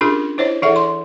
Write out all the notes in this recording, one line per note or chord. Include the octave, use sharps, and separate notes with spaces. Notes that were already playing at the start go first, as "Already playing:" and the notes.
C#4 D4 F4 G4 G#4 A#4
E4 C5 C#5 D#5
E3 E4 G#4 A4 E5 F#5
C6